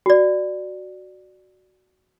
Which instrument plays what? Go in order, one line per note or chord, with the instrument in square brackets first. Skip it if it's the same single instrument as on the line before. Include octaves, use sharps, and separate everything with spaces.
[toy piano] F#4 D5